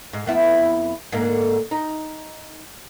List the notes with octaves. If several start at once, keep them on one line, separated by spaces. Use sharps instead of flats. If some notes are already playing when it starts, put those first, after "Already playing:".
G#2
F2 B3 E4
G#2 D3 A#3
D#4